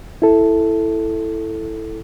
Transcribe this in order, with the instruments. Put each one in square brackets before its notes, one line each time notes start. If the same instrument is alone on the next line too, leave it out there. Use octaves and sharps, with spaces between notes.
[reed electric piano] E4 A4